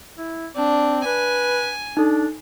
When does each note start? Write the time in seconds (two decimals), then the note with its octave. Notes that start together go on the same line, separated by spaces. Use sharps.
0.18 E4
0.56 C4 D4
1.05 B4 G#5
1.97 D4 D#4 A4